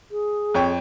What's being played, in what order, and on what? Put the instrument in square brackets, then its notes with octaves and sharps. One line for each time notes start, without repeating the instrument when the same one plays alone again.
[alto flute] G#4
[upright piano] F2 C#5 G5